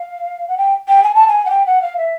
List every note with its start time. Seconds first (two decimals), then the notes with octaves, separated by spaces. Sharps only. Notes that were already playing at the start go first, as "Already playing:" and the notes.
Already playing: F5
0.48 F#5
0.57 G5
0.88 G5
1.03 G#5
1.15 A5
1.28 G#5
1.45 F#5
1.50 G5
1.66 F#5
1.82 F5
1.97 E5